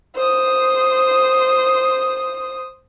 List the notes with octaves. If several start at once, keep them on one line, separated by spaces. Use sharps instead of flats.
C5 D#6